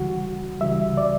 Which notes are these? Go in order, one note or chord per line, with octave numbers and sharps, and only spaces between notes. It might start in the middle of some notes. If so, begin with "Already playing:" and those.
Already playing: C#2 C#3 E3 G3 F#4
C#2 C#3 E3 G3 E5
D5